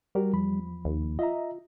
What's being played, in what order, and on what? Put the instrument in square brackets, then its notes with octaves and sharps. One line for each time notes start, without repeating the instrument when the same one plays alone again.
[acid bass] G3 [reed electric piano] F#4 G4 A#4
[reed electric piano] E2 F3 B5
[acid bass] D#2
[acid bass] F4 [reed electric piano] D#5 E5 A#5